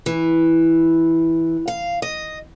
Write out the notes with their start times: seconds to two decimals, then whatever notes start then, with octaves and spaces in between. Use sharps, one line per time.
0.06 E3
1.68 F5
2.02 D#5